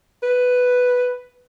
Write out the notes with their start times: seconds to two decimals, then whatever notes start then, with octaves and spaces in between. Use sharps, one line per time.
0.23 B4